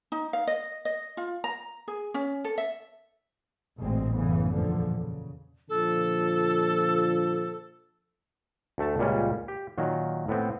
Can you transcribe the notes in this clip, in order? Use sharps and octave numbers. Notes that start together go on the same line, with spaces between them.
D#4
F5
D#5
D#5
F4
A#5
G#4
C#4
A4
E5
A1 D2 G2 A#2 G#3 C4
F#2 C#3 E3 B3
E2 A#2 D3 F3
C#3
A#2 D3 F3 A4
D2 A3 A5
C#2 A#2 G3 C#4
G4
A#2 D#3 F#3
A2 B3 C4